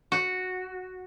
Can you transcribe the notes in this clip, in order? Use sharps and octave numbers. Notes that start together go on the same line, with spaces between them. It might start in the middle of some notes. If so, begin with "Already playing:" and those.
F#4